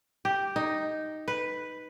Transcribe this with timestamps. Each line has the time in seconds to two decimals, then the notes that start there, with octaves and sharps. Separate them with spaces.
0.25 G4
0.56 D#4
1.28 B4